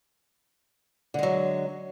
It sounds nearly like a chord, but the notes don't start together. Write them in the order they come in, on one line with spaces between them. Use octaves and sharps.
D3 G#3 F#3